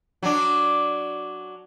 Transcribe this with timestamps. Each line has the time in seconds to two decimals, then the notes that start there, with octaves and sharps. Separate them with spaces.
0.23 F#3 D4